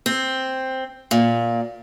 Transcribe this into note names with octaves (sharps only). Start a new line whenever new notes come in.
C4
A#2